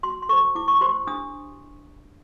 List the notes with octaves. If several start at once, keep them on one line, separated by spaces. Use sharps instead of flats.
F#4 C6
C6
A4 C5 C#6
E4 D6
C#6
G4 C5 C6
D4 D#6